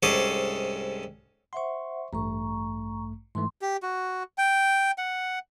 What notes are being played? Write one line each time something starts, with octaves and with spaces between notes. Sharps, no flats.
C2 G#2 C#4 G#4 A4 D6
C5 E5 F#5 C6 C#6
A1 G2 A3 A#5 C#6
G#2 E3 A3 C6
G4
F#4
G5
F#5